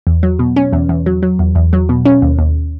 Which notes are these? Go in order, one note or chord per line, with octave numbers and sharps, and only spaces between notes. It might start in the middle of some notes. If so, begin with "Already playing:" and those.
E2
F#3
B2
C#4
E2
E2
F#3
F#3
E2
E2
F#3
B2
C#4
D#2
D#2